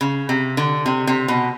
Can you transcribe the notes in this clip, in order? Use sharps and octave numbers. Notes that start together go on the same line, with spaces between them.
C#3
C3
D3
C3
C3
B2